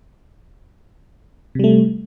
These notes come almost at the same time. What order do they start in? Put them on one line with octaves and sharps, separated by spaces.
C3 G3 A3